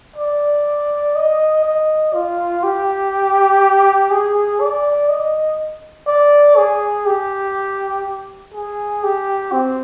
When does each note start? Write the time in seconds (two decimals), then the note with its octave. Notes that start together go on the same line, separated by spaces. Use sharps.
0.16 D5
1.16 D#5
1.65 D#5
2.13 F4
2.64 G4
4.11 G#4
4.61 D5
5.09 D#5
6.07 D5
6.57 G#4
7.06 G4
8.54 G#4
9.04 G4
9.52 C4